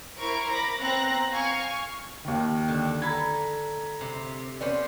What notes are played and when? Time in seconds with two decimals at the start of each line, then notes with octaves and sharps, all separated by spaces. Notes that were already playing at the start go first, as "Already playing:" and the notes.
0.17 E4 A#4 C5 C#6 D7
0.48 B5 D6 A#6
0.79 B3 C4 A#5 F#6 A#6
1.31 F5 G#5 C#6 F6
2.25 D#2 D#3
2.68 D3
3.02 A4 A#5 B5 G#6
4.01 C3
4.61 B3 C#4 C5 D5